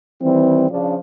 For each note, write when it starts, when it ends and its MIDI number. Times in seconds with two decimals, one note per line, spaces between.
0.22 0.69 51
0.22 0.69 52
0.22 0.69 55
0.22 0.69 60
0.70 0.96 49
0.70 0.96 53
0.70 0.96 62